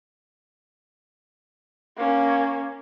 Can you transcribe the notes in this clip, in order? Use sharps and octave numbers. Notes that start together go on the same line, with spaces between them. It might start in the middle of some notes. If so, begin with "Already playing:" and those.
A#3 C#4